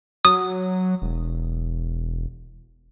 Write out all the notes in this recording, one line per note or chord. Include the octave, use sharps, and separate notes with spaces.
F#3 D#6
E1